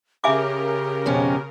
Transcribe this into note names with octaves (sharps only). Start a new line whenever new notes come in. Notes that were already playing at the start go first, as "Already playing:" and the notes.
C#3 G4 A#4 E5 G#5 D6
F2 B2 C#4